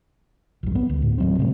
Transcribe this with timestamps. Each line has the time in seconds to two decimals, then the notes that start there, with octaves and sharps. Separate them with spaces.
0.63 A#1 G2
0.75 B3
0.89 D2
1.02 A2
1.18 D#1 F#3 C4
1.39 A2 C3 F#3 G#3